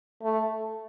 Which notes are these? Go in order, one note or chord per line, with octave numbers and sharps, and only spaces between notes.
A3